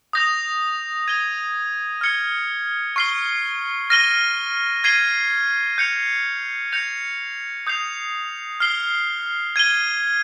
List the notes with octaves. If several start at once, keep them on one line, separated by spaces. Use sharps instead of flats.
D#6 G6 A#6 F7
D#6 G#6 D#7 G7
F6 G#6 C#7 G7
C#6 F6 C7 G7
F6 A#6 D#7 G7
G#6 C7 D#7 G7
G6 C#7 F7
G6 A#6 C#7 F7
D#6 G6 C7 F7
F6 C7 G7
G#6 D#7 G7